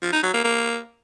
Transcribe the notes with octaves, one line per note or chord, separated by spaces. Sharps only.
F3
D#4
F#3
A#3
A#3